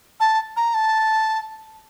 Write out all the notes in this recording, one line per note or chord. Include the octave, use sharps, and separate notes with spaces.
A5
A#5
A5